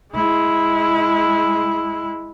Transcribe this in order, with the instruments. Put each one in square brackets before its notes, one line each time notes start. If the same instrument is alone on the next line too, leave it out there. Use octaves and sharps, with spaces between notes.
[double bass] G#3 E4